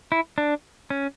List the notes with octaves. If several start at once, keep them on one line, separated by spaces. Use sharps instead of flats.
E4
D4
C#4